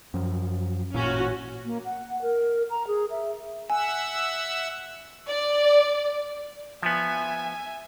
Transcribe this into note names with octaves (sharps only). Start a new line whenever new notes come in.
F#2 F3
A1 A#2 C#4 F#4
A#3
F#5
A#4
A#5
G#4
E5
E5 F#5 G#5 E6
D5
F3 B3 E5 G#5